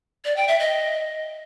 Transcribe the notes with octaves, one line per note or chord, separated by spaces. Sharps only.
D5
G5
E5
D#5